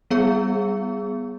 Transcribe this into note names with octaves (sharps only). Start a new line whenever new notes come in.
G3 B3 G#4